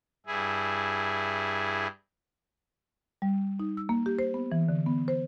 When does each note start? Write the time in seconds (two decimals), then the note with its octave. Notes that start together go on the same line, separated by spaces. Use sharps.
0.26 G2 E4 G#4
3.22 G3
3.60 D#4
3.77 E6
3.89 A#3
4.06 G4
4.19 C5
4.34 B3
4.52 E3
4.69 D3
4.86 B3
5.08 C5